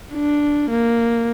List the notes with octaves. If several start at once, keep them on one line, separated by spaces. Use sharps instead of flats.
D4
A#3